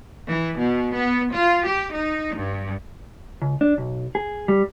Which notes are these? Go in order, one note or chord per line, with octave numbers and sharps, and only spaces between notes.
E3
B2
B3
F4
G4
D#4
G2
C#2
D4
B1
G#4
G3